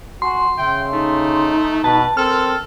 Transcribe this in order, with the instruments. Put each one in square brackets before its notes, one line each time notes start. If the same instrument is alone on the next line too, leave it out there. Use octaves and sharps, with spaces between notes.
[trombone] F#4 [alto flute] G#5 [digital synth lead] C6
[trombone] C#3 [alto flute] E5 [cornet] G5
[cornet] A3 [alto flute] D#4
[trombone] B2 [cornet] B4 [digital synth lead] A5
[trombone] C4 [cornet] A4 [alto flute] A#4 [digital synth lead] F6